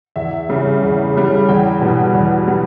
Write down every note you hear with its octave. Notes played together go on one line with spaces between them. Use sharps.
E2 E5
C#3 G3
E2
C#3 G3
E2 G5
B2 G3
E2
G3